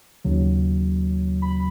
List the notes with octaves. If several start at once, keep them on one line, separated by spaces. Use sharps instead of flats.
D#2 C#3 F#3
B5